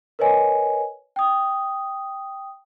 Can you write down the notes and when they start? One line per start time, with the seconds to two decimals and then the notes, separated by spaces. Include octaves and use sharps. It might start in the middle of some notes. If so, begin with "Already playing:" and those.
0.19 A#4 B4 C#5 D#5 G#5
1.16 G5 D#6